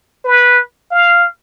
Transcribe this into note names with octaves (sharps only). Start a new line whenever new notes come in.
B4
F5